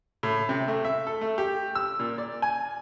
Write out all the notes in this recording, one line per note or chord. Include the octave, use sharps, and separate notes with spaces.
A2
C3
A3
E5
A4
A3
G4
E6
A#2
D5
G#5